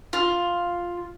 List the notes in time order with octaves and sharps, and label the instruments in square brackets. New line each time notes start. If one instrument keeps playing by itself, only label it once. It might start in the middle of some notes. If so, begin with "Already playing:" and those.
[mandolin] F4